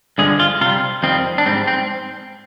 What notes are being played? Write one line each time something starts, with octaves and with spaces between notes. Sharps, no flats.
G2 D3 F3 G#3 G#4
F4
C3 G3 F4
F2 D#3 G3 C4
D4
G#2 G3 C4
C4